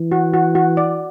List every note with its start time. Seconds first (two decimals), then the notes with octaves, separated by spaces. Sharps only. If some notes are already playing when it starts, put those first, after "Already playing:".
Already playing: E3
0.12 F#4
0.34 F#4
0.55 F#4
0.77 D5